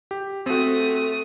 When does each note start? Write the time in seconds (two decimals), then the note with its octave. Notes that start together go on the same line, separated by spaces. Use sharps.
0.11 G4
0.46 A3 C4 F#4 D#6